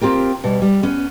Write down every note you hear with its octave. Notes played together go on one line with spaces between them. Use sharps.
C4 F4 G4 A#4
B2 G3
G3
B3 C#4